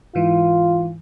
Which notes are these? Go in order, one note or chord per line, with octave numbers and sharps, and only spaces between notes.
G#2 E3 F4